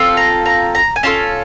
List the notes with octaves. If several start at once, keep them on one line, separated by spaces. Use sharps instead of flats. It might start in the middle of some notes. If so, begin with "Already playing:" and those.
Already playing: C4 F4 A4
A#5
A#5
A#5
G#5
C#4 F4 A4 A5